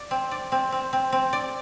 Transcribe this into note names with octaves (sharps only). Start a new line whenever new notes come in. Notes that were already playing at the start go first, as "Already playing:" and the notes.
Already playing: D5
C4
D5
C4
C4
C4
C4
D5